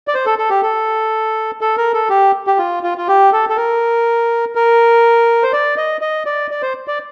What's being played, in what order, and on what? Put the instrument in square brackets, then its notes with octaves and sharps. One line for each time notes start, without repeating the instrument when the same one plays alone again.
[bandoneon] D5
C5
A4
A4
G4
A4
A4
A#4
A4
G4
G4
F4
F4
F4
G4
A4
A4
A#4
A#4
C5
D5
D#5
D#5
D5
D5
C5
D5